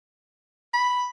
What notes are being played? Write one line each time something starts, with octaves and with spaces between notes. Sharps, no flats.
B5